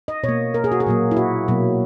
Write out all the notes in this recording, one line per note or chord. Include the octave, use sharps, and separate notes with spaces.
D#5
B2 C#5
A#3
A#4
G#4
F#4
G#4
A#2 F#3 A#3
E4
F#4
B2 F#3 A#3